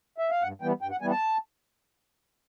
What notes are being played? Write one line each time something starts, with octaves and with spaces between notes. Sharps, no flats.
E5
F5
G2 F#5
E3 G3 B3 G5
G2 G5
F#5
E3 G3 B3 G#5
A5